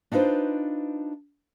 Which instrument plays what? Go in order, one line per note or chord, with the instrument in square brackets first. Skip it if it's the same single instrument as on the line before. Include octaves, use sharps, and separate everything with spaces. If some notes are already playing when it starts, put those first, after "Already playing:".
[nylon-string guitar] D4 D#4 F4 B4 C5